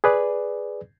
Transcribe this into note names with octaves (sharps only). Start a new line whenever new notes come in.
G#4 B4 D5